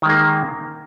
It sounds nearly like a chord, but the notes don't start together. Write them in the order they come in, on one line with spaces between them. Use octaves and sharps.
D#3 G#3 A#3